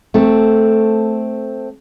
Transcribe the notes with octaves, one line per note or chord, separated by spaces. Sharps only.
A3 C4 A4